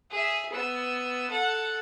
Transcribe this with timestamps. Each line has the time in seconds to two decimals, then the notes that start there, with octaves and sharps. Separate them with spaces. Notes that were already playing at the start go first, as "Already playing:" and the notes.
0.11 G#4 E5
0.52 B3 E6
1.30 A4 F#5